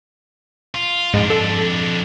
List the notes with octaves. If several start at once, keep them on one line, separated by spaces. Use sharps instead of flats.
F4
F2 G#2 D4
A4